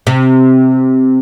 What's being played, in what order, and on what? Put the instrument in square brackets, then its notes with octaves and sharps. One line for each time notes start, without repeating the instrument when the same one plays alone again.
[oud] C3